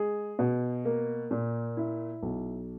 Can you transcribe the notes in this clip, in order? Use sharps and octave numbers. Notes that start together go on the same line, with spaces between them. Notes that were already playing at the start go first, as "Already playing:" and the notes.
Already playing: G#3 G#4
B2
A#3
A#2
E4
B1